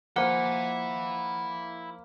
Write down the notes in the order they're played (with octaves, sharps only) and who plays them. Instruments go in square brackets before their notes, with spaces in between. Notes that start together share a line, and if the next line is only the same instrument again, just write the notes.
[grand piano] F3 C5 [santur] A#3 [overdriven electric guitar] E4 G#5 [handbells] F#5